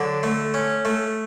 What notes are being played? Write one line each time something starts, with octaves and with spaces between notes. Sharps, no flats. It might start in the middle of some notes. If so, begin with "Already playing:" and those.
Already playing: D3 F#3
A3
C#4
A3